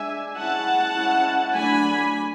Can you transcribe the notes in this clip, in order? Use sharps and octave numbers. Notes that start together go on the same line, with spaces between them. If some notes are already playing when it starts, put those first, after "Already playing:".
Already playing: G#3 D4 E5 G#5
G#3 C#4 E4 F#5 A5
G#3 C#4 E4
F#3 A3 D4 G#5 B5